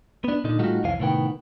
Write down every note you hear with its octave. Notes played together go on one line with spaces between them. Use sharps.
B3 D4
A#2 D3 D#4
A2 G3 A3 D#4 F4 F#4
C2 F2 E3 C#4 F5
A2 C3 D#3 B3 G5